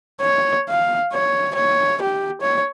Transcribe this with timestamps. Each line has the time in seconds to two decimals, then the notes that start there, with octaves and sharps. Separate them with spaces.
0.21 C#5
0.69 F5
1.13 C#5
1.55 C#5
2.02 G4
2.42 C#5